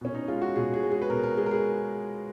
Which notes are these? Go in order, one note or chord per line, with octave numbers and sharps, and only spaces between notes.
B2 C#4
D#4
G#3 F4
F#4
B2 G#4
G#4
G#3
G#4
B4
B2 A#4
A#4
G#3 G#4
A#4
G#4